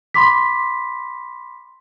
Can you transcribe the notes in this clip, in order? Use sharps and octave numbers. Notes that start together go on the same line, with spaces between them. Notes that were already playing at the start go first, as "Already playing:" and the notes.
B5 C6 D6 B6